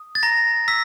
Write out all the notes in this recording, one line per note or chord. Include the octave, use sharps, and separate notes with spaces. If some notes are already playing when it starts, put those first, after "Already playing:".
Already playing: D#6
A6
A#5 A#6
E6 B6